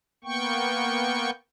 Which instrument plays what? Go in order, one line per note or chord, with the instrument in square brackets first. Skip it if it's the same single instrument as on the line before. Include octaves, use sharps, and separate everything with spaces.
[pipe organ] A#3 B3 G5 C#6